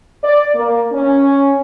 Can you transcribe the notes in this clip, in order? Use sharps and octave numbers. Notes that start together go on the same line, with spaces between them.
D5
A#3
C#4